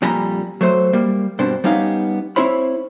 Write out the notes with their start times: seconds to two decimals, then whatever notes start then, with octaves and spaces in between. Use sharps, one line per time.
0.02 F2 A#2 G3 G#5 A#5 B5
0.61 F#3 A3 C5
0.93 G3 A#3
1.39 G2 B2 C4 D4
1.64 G3 B3 C#4 D#4 F5
2.36 C4 E4 C5 C#5 B5